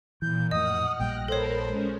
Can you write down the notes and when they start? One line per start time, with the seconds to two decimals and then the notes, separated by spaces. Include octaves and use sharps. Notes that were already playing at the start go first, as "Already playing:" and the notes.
0.22 A#2 E3 G6
0.51 F2 A2 D#5 F#5 D#6 F6
0.99 A#1 A#2 G3 G5 F6 F#6 A#6
1.28 A4 A#4 C5 C#5 A5 B5
1.66 G#3 C#4